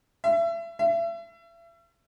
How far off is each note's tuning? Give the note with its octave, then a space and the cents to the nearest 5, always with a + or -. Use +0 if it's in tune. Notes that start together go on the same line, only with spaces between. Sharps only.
E5 +30
E5 +35